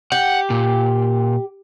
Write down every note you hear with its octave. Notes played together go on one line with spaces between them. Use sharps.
G4 F#5
A#2